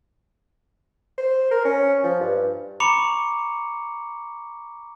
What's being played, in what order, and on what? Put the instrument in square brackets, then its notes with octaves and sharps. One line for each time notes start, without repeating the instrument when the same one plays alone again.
[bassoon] C5
A#4
C#4
F3
G2
[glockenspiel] A#5 B5 C#6 D6 C#7 F7